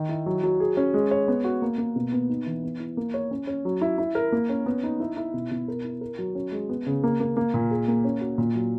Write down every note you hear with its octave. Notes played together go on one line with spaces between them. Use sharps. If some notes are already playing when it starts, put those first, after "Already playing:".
Already playing: D#3
E4
F#3
F#3
G#4
C#4
G#3
C#5
B3
F#4
A#3
A#3
B2
B3
D#4
E3
B3
E4
A#3
C#5
C#4
C#4
F#3
E4
E4
A#4
A#3
C#4
B3
D#4
E4
E4
B2
B2
A#4
E4
A#4
F#3
C#4
G#3
B3
C#3
A#3
A#3
A#3
A#2
G#4
A#3
C#4
F#4
A#2
F#3